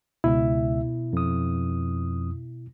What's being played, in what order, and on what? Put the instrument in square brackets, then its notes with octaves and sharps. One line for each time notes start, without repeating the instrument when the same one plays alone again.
[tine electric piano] C#2 E5 [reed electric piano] B2 E4
[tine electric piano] F2 D#6